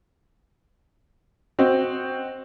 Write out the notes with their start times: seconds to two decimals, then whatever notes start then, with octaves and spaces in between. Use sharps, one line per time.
1.59 C4 F#4 D#5